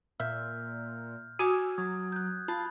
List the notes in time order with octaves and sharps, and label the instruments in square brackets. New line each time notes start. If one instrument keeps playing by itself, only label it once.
[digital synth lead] A#2 [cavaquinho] E5 [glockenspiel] F6 G6
[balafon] F#4 [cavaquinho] C#5 G#5 D6 [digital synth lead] E6
[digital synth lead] F#3 [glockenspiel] D#6 G#6
[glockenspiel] F#6 G6
[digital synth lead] F4 [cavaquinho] A5 [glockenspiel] B5